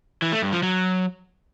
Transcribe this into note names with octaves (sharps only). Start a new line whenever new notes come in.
E3
A3
G2
F3
F#3